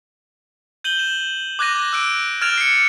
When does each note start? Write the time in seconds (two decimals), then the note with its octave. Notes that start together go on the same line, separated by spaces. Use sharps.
0.84 G6 D#7 F#7 G7
0.99 E7
1.59 D6 F#6 G#6 A#6 D#7
1.93 E6 F#6 D7
2.42 F6 G#6 A6 D7 E7 F7
2.58 C7 C#7